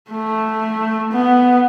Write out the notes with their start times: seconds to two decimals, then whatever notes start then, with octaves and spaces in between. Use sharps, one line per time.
0.11 A3
1.12 B3